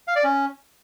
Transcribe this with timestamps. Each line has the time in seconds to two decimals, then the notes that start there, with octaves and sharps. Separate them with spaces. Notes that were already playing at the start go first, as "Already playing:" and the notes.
0.08 F5
0.16 D5
0.24 C#4